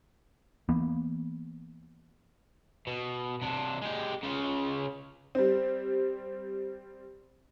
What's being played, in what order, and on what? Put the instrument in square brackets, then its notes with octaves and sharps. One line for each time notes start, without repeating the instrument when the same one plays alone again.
[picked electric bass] E3 A#3 B3
[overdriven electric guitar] B2
C3 D4
G#3 G4
C#3 F4
[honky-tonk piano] G3 C4